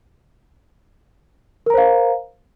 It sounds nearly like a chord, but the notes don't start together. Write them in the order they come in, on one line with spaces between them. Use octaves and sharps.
A#4 A#5 C5 F5